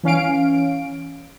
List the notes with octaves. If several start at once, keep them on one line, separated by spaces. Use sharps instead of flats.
E3 C#4 F5 D7